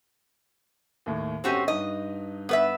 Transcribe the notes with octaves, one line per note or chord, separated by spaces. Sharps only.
D#2 A2
G1 C4 C#4 F#4 G4 D#7
G2 D#4 D#5
B3 B4 E5